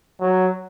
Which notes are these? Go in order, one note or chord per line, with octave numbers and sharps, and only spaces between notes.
F#3